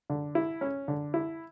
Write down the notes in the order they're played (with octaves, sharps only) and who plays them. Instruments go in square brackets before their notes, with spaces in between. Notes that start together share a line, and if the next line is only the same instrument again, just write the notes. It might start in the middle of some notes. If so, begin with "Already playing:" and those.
[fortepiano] D3
E4
C#4
D3
E4